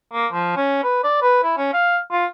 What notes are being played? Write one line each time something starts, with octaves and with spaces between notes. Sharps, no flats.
A#3
F3
C#4
B4
D5
B4
E4
C#4
F5
F4